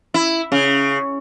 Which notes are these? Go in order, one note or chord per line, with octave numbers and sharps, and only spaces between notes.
E4
C#3